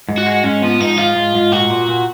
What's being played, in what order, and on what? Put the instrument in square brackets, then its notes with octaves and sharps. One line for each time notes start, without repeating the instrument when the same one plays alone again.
[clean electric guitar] G#2
[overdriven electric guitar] F#4
[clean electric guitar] G#3
[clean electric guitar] G#2 [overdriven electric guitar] C#4
[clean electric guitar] F3 [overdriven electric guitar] B3
[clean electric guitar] G#2 [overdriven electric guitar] D#4
[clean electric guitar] F3 [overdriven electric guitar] F4
[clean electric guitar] G#2
G#2
[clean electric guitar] A#2 [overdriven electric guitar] F#4
[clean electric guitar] A#2
A#2